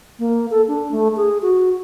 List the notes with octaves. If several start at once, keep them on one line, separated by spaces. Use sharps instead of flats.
A#3
A4
D4
A3
G#4
F#4